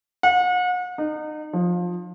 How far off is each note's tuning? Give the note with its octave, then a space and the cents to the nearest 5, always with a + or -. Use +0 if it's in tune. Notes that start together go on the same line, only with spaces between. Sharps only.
F#5 -40
D#4 -30
F3 +15